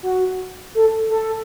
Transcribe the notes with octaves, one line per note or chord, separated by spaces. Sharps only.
F#4
A4
A4